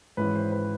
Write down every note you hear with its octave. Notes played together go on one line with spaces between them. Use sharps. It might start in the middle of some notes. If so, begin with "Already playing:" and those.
G#1 G#2 E3 G#3 C#4 B4
C5
B4